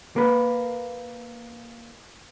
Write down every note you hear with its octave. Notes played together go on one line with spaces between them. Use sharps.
A#3 B4